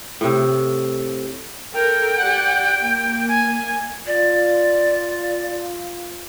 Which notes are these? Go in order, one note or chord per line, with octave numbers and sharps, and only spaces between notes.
A2 C3
A4 A#4 G5
G4 D5 F#5
A#3
G#5
F4 D5